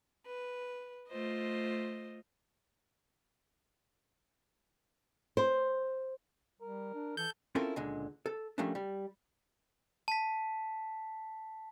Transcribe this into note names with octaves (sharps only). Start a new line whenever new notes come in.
B4
A3 F4 C5 D#5
C5
G3 A#4
D4
E3 A4 G6
C4 C#4 E4 F4 A4 A#4
C#2 A#2 D3 G#3
A4
F3 G3 A3 A#3 C#4 D4
G3
A5 B6